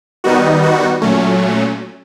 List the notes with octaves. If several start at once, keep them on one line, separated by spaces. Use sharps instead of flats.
D#3 G3 B3 D#4 F#4
F#4
A#2 F#3 A3 C#4